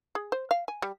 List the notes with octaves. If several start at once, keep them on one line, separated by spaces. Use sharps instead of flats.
G#4
C5
F5
G#5
G3